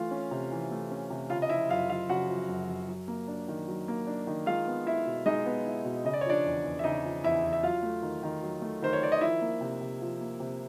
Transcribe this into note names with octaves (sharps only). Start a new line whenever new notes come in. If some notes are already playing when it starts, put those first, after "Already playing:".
Already playing: E3 A3 F4 F5
C#4
C3
E3
A3
C#4
C3
C#3 F4 F5
D#5
F3 E4 E5
F#2 F4 F5
F#2 F4 F5
C#3 F#4 F#5
F3
F#2
F#2
F#3
A#3
D4
D#3
F#3
A#3
D4
D#3
G#3 F4 F5
B3
E4 E5
B2
G#3 D#4 D#5
B3
E4
B2
C#3 D#5
D5
C#5
F3 D4 D5
E2
E2
E5
C#3 D#4 D#5
F3
E2 E4 E5
E2
E5
F#3 F4 F5
A3
D#3
D#3
F#3
A3
D#3 C5
C#5
D#3 D5
D#5
F3 E4 E5
A#3
C3
C3
F3
A#3
C3